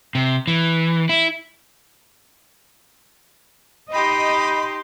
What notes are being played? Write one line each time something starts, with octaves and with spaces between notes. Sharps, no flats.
C3
E3
E4
D#4 G4 D#5 B5 C6